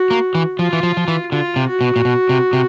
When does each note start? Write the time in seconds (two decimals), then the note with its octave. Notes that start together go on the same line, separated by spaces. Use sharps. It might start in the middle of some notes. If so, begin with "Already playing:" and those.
Already playing: F#4
0.11 A#3
0.35 E3
0.59 F3 F4
0.73 E3
0.83 F3
0.97 F3
1.08 E3
1.32 D3 F4
1.56 C3
1.69 F#4
1.81 B2
1.96 A#2
2.05 B2
2.29 C3
2.53 C3